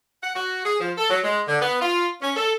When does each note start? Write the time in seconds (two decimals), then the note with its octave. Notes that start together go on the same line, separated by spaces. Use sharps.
0.22 F#5
0.34 F#4
0.64 G#4
0.79 F3
0.97 A4
1.09 F#3
1.23 G#3
1.47 D3
1.60 B3
1.81 F4
2.21 C#4
2.36 A4